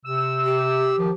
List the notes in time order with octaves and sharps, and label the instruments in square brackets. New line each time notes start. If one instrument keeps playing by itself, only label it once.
[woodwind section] C3 E6
[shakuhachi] G4
[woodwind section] D#3 F3